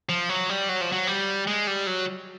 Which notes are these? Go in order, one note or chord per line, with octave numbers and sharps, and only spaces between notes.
F3
F#3
G3
F#3
F3
F#3
G3
G#3
G3
F#3